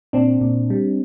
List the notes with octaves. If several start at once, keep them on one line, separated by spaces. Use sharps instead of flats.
A#2 C4 D4
A#2
G3